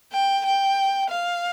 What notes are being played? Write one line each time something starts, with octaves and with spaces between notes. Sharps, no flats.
G5
G5
F5